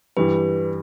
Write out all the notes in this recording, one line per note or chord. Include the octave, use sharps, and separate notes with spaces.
G2 E3 G3 B4